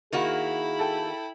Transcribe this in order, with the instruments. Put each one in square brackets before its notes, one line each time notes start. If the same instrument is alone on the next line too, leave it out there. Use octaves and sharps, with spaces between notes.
[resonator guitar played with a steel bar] D#3 A#3 F#4 [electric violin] E4 B5 [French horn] G#4
[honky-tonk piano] A4 G5